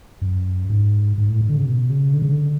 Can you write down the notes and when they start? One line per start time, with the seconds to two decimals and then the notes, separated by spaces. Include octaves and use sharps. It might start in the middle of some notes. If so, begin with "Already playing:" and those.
0.22 F#2
0.70 G#2
1.18 G#2
1.29 A2
1.41 G#2
1.49 D3
1.57 C#3
1.66 B2
1.90 C#3
2.13 D3
2.22 C#3
2.32 D3